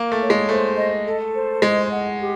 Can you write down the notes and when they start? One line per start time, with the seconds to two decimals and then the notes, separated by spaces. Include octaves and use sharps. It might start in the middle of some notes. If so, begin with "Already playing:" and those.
Already playing: A#3 A#4
0.12 A3
0.21 C#5
0.30 G#3
0.49 A3 C5
0.77 D#5
1.06 A4
1.35 C5
1.62 G#3 D#5
1.91 F#5
2.19 G4